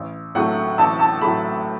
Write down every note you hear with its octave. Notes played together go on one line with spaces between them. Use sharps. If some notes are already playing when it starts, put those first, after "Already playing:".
Already playing: A1
A2 F#3 A3 F#5
A1 A5
A5
A2 F#3 A3 B5